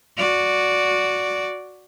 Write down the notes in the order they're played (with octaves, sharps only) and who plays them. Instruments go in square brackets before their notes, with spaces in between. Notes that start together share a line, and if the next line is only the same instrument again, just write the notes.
[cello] F#4 D5